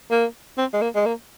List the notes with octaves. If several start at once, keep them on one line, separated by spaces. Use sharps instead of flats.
A#3
C4
G#3
A#3
G#3
A#3